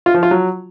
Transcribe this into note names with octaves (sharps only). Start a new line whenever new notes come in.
F4
F3
F4
F#3